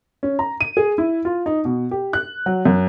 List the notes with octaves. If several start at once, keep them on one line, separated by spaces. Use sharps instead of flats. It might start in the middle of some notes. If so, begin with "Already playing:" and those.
C#4
A#5
D#7
G#4
E4
F4
D#4
B2
G4
F#6
F#3
F#2